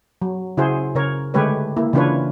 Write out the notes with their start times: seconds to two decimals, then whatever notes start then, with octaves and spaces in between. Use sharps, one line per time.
0.22 F#3
0.57 C#3 E4 F#4 G#4 C5
0.95 C#3 A#4 C#5
1.34 D3 G#3 A3 G4 B4 C#5
1.77 A#3 E4
1.93 C#3 E3 D4 F4 B4 C#5